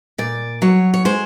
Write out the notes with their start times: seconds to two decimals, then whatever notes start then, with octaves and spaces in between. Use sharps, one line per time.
0.18 A#2 D5
0.62 F#3 C#5
0.94 C#5
1.05 G#3 C5